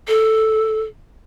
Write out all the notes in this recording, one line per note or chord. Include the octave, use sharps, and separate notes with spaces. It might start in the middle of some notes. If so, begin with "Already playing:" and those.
A4